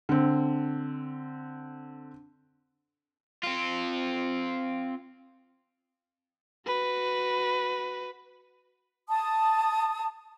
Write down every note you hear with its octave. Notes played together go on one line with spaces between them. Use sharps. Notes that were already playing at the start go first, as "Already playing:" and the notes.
D3 C4
C4 F4
F#4 B4
A5 D#6